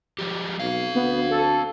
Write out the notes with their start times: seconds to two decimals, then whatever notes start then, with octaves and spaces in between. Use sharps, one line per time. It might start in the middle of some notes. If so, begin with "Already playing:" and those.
0.19 F3 G#3 G4
0.59 B1 C4 F5
0.95 D2 B3
1.31 A4